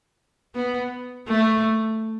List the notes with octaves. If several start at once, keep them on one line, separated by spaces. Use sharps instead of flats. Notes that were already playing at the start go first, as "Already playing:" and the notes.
B3
A3